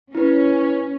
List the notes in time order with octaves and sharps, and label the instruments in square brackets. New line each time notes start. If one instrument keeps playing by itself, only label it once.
[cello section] C#4 [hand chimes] E4 B4